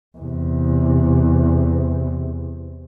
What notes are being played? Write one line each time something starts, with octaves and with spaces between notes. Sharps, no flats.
E2 C3